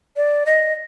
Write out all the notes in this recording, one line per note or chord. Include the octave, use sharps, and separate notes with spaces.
D5
D#5